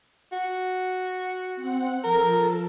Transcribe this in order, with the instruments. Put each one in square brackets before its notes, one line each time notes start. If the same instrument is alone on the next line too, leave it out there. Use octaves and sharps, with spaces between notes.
[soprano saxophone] F#4
[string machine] C4 F#5
[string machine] F3 A4 [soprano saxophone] A#4